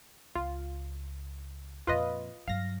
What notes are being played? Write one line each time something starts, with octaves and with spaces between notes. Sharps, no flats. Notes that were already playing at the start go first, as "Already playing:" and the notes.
C#2 F4
F2 A#2 F4 B4 D#5
G2 F#3 F5 A#6